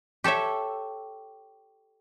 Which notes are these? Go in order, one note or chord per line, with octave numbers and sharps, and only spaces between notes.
G4 A4 C#5 E5